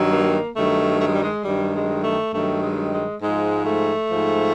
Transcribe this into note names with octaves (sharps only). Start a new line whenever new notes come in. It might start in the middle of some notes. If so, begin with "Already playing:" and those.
Already playing: G2 D#3 F#3
A#3
G2 D#3 F#3 A3
A3
G#3
G3
G#3
G2 D#3 F#3 G3
G#3
A3
G2 D#3 F#3 A3
G#3
G#3
G#2 F3 G#3
A3
G#2 F3